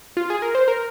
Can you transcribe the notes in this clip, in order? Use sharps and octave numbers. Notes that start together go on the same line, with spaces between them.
F4
G#4
A#4
C5
A#4